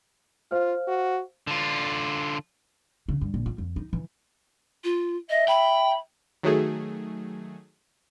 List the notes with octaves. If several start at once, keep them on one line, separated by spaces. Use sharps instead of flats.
F4 C5 F5 F6
F#4
D3 F4
C#3
G2
A#1
F4
F2
D#4
E3
F4
D#5 E5
G5 B5
D#3 F#3 A3 G#4